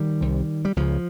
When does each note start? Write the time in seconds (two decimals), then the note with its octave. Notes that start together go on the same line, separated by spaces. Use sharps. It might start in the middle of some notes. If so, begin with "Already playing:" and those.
Already playing: D#3 G3
0.21 C2 C3
0.65 G3
0.76 C#2 C#3 F3